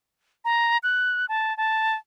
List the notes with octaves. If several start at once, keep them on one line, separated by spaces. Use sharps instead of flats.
A#5
F#6
A5
A5